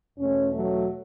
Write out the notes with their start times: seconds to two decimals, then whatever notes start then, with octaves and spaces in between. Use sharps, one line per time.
0.18 E2 B2 A3 C#4
0.54 F#3 A3